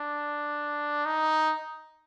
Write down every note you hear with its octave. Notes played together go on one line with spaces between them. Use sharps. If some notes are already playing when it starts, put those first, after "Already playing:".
Already playing: D4
D#4